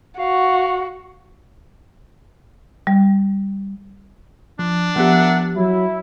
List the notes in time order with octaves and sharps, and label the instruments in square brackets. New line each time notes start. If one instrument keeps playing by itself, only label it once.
[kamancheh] F#4 [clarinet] F5
[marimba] G3
[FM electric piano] F3 [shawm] D4
[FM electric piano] F3 B3 G4 [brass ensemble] A#4 E5 F#5
[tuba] F#3 [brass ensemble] E4